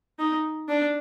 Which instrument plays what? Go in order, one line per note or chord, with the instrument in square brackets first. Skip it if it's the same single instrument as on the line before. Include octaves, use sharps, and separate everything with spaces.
[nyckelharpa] D#4
D4